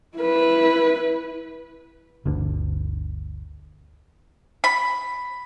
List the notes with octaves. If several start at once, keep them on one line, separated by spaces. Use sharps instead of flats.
E4 B4
G1 D2 D3
B5